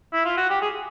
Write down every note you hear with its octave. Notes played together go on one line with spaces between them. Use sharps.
E4
F4
F#4
G4
G#4